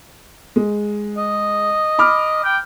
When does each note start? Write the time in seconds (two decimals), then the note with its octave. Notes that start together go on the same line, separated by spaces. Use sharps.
0.56 G#3
1.18 D#5
1.99 B5 D6 F6
2.44 G5